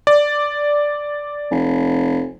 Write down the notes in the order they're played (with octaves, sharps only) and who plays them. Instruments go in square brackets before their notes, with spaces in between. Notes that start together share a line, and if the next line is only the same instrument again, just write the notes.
[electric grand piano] D5
[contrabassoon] F1